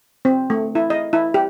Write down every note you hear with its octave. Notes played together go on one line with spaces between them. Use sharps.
C4
A3
E4
D#5
E4
G4